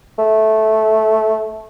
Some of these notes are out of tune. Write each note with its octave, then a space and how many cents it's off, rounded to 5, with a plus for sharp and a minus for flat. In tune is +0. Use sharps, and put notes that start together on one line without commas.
A3 -10